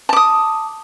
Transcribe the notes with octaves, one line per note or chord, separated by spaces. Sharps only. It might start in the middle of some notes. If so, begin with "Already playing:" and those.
A5 D6 D#6